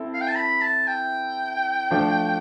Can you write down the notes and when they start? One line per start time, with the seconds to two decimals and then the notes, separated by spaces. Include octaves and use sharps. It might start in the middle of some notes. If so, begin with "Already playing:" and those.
Already playing: C4 E4 A4
0.14 F5
0.21 G5
0.28 A5
0.36 B5
0.61 A5
0.88 G5
1.91 F3 A3 D4 F4